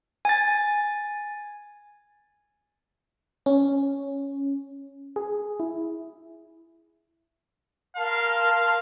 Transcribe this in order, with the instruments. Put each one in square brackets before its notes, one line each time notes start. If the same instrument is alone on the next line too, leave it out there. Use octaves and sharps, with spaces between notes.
[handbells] G#5 A6
[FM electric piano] C#4
G#4
E4
[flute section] A#4 A5 C6 [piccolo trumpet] F5